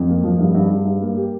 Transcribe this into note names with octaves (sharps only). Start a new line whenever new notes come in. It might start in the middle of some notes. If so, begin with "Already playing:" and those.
Already playing: F2
A#3
F3
G2
G2
G2
G2
A#3
G4